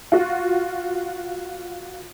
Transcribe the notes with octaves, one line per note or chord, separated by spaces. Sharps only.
F4 F#4